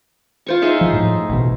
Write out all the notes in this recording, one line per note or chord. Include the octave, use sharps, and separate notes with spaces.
F4 C5 C#6
D#4 G#4 E5
F3
A2
A1 B2